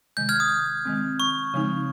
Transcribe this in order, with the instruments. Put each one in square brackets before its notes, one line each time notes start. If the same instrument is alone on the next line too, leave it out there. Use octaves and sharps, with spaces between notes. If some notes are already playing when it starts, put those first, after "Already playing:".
[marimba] C3 D#3 G#3 [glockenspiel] G6
[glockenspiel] F6 G#6
D#6
[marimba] D#3 G#3 C4
[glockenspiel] C#6
[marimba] C#3 F3 G#3 C4 D#4